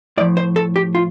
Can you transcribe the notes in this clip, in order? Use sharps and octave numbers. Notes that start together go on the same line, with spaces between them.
A2 F3 D5
C5
A4
G4
F4